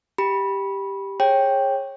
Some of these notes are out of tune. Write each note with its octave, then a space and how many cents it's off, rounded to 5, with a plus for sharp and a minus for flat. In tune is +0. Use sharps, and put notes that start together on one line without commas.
G4 +0 B5 -15
G#4 +0 C#5 -25 G5 +0